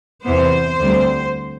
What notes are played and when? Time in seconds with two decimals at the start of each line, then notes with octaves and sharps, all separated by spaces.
0.24 E2 C3 E3 B3 C5
0.81 D2 D3 G3 C4